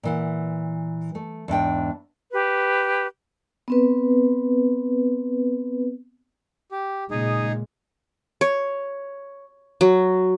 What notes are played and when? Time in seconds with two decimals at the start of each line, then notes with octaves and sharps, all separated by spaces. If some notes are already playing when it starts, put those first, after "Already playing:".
0.03 A#2 E3 F#5
1.15 A3
1.48 E2 G#2 D4 G5
2.32 G4 B4
3.68 B3 C4 B4
6.72 G4
7.11 A#2 C#3 G#3 D#4 G#4
8.41 C#5
9.81 F#3